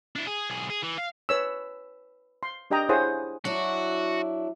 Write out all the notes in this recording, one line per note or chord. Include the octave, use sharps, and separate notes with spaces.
D4 E4
G#4
B1 G#4
G#4
E3
F5
B4 C#5 E6
C6
D4 G4 D#5 G5 A#5 D#6
E4 G#4 C5 C#5 F#5 D#6
F#3 D4 E4 F#4